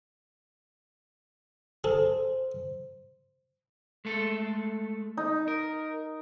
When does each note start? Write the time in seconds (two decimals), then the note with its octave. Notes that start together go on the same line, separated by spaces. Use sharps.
1.84 G#4 A4 C5
4.05 G#3 A3 A4
5.17 D#4
5.48 A#4